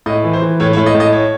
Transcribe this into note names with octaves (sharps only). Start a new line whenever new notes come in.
A2 D#5
E3
C5
E3
A2 C#5
C#5
A2
D#5
A2
D#5
C#5